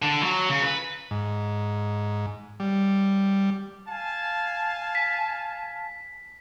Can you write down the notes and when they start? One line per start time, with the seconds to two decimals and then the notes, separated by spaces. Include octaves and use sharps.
0.02 D3
0.23 F#3
0.49 C#3
0.63 B4
1.11 G#2
2.60 G3
3.88 F5 G#5 A5
4.95 B6